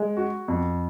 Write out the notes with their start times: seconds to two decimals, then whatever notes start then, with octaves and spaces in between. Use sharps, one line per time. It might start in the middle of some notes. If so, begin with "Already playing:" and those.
Already playing: G#3
0.17 F#4
0.48 F2